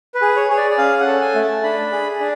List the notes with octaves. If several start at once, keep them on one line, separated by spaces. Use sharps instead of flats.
B4
G#4
C#5
G#4 C#5
D5
D5
C#4 F5
F#5
A4
G#5
A3
A5
D4 B5
G#4
D4